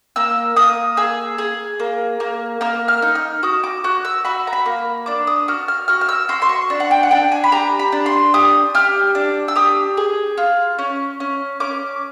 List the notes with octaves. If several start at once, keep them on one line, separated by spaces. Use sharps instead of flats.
A#3 E6
A#3 D#6
G#4 E6
G#4
A#3
A#3
A#3 F6
F6
D#4
F6
F#4 D#6
D6
F#4 F#6
E6
F#4 B5
A#5
B5
A#3
D4 D6
D#6
F#4 F6
F6
F#4 F6
F6
E6
F#4 C6
C6
C#6
D4
F#5
G5
F#5
D4 G5
G#5
B5
G4 A#5
B5
D4
C6
G4 D#6
G4 F6
D4
E6
G4 D#6
G#4
F4
C#4
C#4
C#4 D6